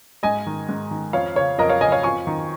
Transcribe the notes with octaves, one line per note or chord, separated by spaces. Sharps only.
G#2 D#5 G#5
D#3
G#2
D#3
F2 C#5 F5
C#3 C#5
F2 A#4 D#5
C#5 F5
C#3 D#5 G#5
C#5 F5
F2 G#5 C#6
D#3